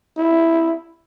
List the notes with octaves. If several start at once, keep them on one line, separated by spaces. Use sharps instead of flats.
E4